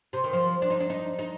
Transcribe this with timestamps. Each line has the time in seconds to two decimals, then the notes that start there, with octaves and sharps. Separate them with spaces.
0.13 C3
0.24 D#3
0.33 F3
0.62 D4
0.70 D#4
0.80 D4
0.90 D#4
1.19 D#4